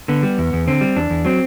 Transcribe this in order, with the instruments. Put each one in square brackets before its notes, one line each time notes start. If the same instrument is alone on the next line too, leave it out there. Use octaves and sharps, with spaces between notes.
[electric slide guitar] D3 B3
G3
E2
E2
D3 C4
G3
E2 D4
E2
F#3 C4